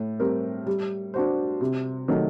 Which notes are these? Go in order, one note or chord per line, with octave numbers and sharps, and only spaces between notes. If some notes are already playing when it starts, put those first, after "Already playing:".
Already playing: A2
G3 C4 G4 A#4
G3
D4 F#4 C5
C3
D#3 F#3 A3